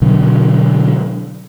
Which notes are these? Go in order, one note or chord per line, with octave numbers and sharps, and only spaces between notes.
B2 D3 F#3